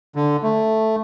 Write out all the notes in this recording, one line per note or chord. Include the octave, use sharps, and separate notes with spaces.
D3
A3